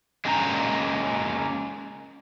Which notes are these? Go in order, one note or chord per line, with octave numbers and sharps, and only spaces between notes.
G#3 A#3 C#4 G5 G#5 A#5